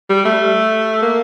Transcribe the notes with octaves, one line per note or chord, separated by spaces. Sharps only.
G3
A3
A#3